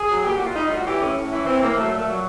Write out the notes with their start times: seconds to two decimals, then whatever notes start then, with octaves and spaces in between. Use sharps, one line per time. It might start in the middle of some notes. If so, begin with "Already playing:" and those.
Already playing: G#4
0.09 F#3
0.24 A#2 G4
0.35 F#4
0.40 A#2
0.45 F4
0.56 G3 D#4
0.66 A2 F4
0.76 F#4
0.86 E3 G4
1.01 A2 C#4
1.17 A2
1.32 E3
1.46 E3 C4
1.62 A2 A#3
1.77 F#3 A3
1.87 A3
1.93 A#2
1.98 A3
2.08 F#3